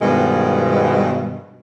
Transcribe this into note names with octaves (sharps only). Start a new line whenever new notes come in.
G2 B2 D#3 F3 G#3 B3